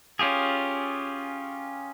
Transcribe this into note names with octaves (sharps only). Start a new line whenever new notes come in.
C#4 F4 G4 G#4